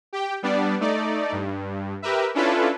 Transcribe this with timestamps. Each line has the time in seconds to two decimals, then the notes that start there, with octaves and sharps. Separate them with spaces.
0.13 G4 G5
0.42 G3 B3 D4 D5
0.80 A3 D#4 D5
1.32 G2
2.02 G4 A#4 B4 E5
2.34 C#4 D4 E4 F4 A4 B4